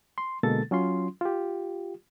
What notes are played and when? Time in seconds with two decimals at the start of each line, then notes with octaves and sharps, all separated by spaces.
0.18 C6
0.43 B2 D3 G#3 A#3 A4 A6
0.71 F#3 C#4 F4 C6
1.21 F4 G4